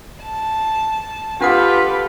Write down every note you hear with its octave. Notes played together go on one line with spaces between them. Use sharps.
A5
D4 F4 G4 A4 B4 F#5 D#6